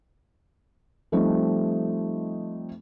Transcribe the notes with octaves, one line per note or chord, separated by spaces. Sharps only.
F3 G3 A3 C4 D#4